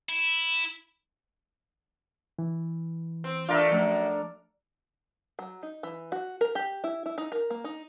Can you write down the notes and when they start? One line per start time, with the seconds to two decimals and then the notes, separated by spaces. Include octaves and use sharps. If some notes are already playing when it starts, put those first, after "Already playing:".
0.09 E4
2.39 E3
3.24 C4
3.48 A3 D4 F4 A4 A#4
3.71 F#2 F3 A3
5.39 F#3
5.63 D#4
5.83 E3
6.12 F#4
6.41 A#4
6.55 G4
6.84 E4
7.06 E4
7.18 D#4
7.32 A#4
7.50 A#3
7.64 D#4